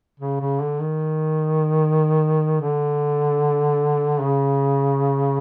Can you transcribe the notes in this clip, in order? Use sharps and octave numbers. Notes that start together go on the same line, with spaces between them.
C#3
C#3
D3
D#3
D3
C#3